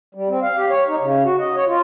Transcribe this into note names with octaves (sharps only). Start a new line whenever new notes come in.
G3
C4
F5
G4
C#5
D#4
C#3
F#4
D#5
C#5
F4